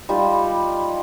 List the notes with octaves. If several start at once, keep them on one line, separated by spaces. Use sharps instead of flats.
G3 D#4 F4